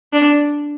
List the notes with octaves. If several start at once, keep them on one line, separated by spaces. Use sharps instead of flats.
D4